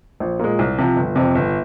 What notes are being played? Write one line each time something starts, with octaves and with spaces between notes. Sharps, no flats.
A#1
A#2 G#3
C2
C3 F3
G1
F2 C3
G1